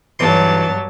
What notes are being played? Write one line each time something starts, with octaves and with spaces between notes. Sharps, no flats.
B1 G2 E3 F#3 A5 C6